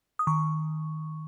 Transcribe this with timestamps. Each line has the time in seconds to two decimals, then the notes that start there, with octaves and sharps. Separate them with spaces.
0.19 D#6
0.27 D#3 C#6